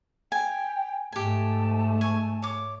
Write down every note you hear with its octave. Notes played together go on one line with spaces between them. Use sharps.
G5 G#5
G#2 A3 G4 G#5 A5
G#5 C#6
C#5 D6